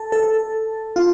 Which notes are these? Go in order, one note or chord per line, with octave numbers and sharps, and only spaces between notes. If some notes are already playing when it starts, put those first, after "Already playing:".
Already playing: A4
A4
F4